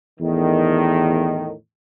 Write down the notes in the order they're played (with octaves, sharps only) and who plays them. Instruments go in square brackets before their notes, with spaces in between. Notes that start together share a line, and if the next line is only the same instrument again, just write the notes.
[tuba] E2 [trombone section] A2 D#3